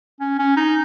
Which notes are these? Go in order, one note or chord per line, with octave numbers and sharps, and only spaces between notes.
C#4
C#4
D#4